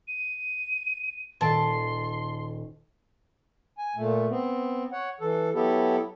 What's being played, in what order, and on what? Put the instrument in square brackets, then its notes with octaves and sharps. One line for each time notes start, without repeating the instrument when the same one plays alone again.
[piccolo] D#7
[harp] D#1 A4 D7 [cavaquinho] A5 [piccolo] C6
[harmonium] G#5
A#2 A3
B3 C4
C#5 F#5
E3 A4
F#3 B3 E4 G4 A4